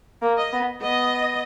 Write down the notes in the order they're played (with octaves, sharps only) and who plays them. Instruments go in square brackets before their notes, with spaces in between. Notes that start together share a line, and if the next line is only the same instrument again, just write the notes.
[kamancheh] A#3
[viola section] D#5
[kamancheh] B3
[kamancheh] B3 [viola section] D#5